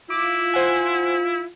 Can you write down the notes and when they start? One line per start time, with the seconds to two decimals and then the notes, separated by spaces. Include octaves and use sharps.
0.10 E4 F4 D6
0.54 C5 F#5 G#5